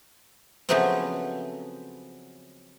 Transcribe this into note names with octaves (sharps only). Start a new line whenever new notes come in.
C#3 F3 F#3 A3 B3 C4